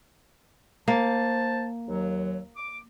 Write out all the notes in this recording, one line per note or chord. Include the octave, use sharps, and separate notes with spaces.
A#3 C5 A5
D#2 F#3
D6